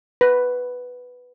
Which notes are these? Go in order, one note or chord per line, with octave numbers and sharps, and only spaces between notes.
B4